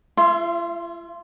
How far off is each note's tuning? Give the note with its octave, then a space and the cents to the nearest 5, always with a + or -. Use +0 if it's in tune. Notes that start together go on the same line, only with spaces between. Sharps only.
F4 -45 E5 +20 C6 +0